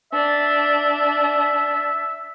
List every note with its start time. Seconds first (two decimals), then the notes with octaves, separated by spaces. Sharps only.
0.13 D4 E5